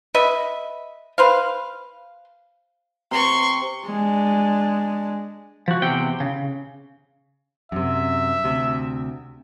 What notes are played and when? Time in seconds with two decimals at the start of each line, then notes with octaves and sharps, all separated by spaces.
0.14 B4 D#5 E5
1.18 B4 C5 F5
3.11 C3 C6 C#6
3.85 G#3 D4
5.68 F3 F#4
5.82 E2 C3 G5
6.20 C#3
7.72 F#2 C3 E5
8.44 D2 C3